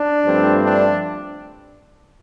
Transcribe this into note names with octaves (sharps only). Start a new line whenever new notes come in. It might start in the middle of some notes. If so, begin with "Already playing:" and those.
Already playing: D4
G2 F3 A3 C4
D4